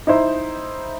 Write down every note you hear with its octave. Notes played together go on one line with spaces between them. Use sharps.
D#4 E4 C5